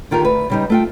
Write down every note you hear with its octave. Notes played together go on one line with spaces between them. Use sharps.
D3 D#3 F4 G4 A#4
D2 B4
C#3 G3 D#4
A3 F4 G5